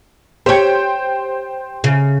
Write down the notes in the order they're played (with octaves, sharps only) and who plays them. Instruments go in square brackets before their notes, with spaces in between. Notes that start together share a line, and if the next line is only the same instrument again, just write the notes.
[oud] G4 C#5 [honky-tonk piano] C5 G5
[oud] C#3